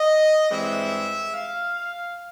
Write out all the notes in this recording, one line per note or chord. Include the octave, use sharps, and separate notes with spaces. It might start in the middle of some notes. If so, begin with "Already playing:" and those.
Already playing: D#5
G2 E3 G#3 C4 E5
F5